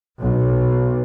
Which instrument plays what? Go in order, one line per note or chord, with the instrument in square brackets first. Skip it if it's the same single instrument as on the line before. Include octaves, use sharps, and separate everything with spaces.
[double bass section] B1